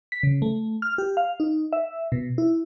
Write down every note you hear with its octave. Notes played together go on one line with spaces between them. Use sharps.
B6
C#3
A3
F6
G4
F5
D#4
E5
B2
E4